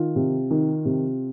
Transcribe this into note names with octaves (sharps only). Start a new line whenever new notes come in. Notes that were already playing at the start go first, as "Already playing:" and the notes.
Already playing: D#3 F4
C3
D#3
C3